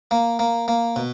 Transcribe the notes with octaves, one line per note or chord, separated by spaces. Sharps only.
A#3
A#3
A#3
B2